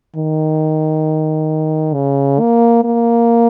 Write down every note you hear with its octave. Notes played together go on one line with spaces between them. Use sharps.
D#3
C#3
A#3
A#3